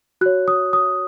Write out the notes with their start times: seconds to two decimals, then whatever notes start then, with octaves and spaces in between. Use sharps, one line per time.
0.21 F#4 C#5 F#6
0.48 D#6
0.73 D#6